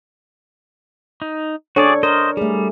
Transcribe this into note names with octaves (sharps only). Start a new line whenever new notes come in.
D#4
D4 F#4 G#4 A4 C#5 D5
A#4 C5 D#5
G3 A3 G#4